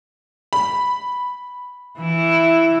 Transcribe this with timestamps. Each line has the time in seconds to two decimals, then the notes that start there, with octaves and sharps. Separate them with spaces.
0.53 B5
1.99 E3 E4